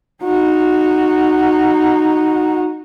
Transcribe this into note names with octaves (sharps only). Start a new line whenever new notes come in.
D#4 F#4